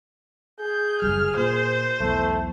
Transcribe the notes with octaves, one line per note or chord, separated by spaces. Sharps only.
G#4 G6
F#1 B1 G3 F6
A#2 C5
B1 E2 A3